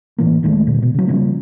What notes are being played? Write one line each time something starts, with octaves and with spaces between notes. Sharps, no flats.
A2 E3 A#3
D1 D#3 G#3 A3
A#2 D3
B2
C#3 F#3
C#3 F3 G3 A#3